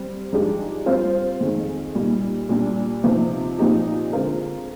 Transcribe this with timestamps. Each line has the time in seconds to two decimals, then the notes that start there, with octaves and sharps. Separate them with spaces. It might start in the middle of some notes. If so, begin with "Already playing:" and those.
Already playing: G3 C4
0.32 G#2 F3 G#3 D4 G4
0.86 G3 C4 F4 C5
1.41 F2 D#3 G#3
1.95 A#2 G3 A#3 D#4
2.49 A#2 G3 D4
3.04 C3 F3 C4 D#4
3.58 A#2 F3 C4 D#4 G4
4.12 D3 G#3 C4 F4 A#4